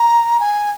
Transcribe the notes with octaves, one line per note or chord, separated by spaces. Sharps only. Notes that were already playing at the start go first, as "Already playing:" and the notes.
Already playing: A#5
G#5